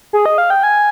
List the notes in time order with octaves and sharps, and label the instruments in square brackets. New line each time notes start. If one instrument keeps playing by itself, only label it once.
[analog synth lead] G#4
D#5
F5
G5
G#5